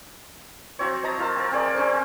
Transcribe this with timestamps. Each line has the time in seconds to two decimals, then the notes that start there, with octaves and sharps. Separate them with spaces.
0.79 F3 F#3 C4 C#5
1.04 D#5 A5 A#5
1.18 F3 F4 A#4 A5
1.36 C4 A#4
1.52 C4 G#4 C#5 D5
1.75 C4 C#4 G#4 C5